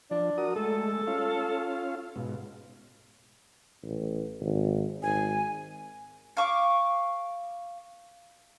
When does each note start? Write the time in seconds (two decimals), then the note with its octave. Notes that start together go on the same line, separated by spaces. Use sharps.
0.11 F3 D4
0.38 F#4 A#4 D#6
0.56 G#3 A3 A4
1.07 C#4 F4 F5
2.16 G#2 B2
3.83 A1
4.40 G#1
5.03 G#1 G#5
6.37 F5 C#6 D6